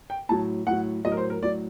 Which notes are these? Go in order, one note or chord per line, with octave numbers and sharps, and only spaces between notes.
G5
A2 F#3 A5
A2 F#3 F#5
A2 F#3 D#5
A#4
C5
A#4
A2 F#3 D5